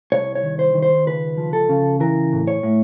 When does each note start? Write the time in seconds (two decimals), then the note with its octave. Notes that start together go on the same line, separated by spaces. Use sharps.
0.12 C2 C#5
0.35 C#5
0.43 D#3
0.59 C5
0.75 D#3
0.82 C5
1.06 C#2 B4
1.37 F3
1.53 A4
1.69 C#3
2.00 E3 A#4
2.33 A2
2.48 C#5
2.63 A2